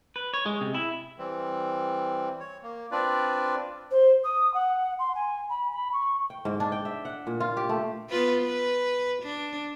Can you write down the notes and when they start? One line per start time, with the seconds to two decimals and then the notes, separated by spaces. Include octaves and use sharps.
0.16 B4
0.34 C#5
0.46 G#3
0.61 C3
0.74 E4
1.18 E3 G3 C4
2.40 C#5
2.63 A#3
2.91 C4 D4 F4 B4 D5
3.91 C5
4.24 D#6
4.54 F#5
4.99 C6
5.15 G#5
5.49 B5
5.72 B5
5.92 C#6
6.30 G5
6.45 G#2
6.60 D4
6.72 G5
6.85 E5
7.05 F#5
7.27 A#2
7.40 F4
7.57 G4
7.69 A3
8.09 B3 F4 B4
8.42 B4
9.23 D4